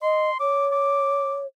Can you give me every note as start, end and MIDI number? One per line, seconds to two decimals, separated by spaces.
0.02 0.30 75
0.02 0.37 84
0.40 1.46 73
0.40 0.67 86
0.72 1.38 86